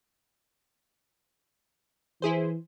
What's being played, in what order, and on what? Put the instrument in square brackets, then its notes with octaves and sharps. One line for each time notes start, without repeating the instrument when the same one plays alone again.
[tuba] E3 [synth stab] E4 G#4 C5